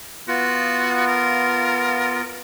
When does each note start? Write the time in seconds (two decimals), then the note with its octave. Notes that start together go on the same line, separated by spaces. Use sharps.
0.28 B3 F4 F#4
1.07 A#4